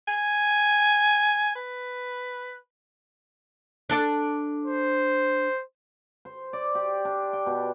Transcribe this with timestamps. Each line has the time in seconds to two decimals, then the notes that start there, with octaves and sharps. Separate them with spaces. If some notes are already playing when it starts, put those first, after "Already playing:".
0.08 G#5
1.55 B4
3.90 D4 A4 D5
4.65 C5
6.25 C5
6.53 D5
6.75 G4
7.05 D4
7.33 G5
7.46 B2